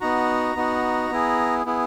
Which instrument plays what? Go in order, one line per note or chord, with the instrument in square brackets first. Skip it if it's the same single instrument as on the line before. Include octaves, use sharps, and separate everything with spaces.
[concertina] B3 D#4 F#4 A#5
B3 D#4 F#4
B3 E4 G#4
B3 E4 G#4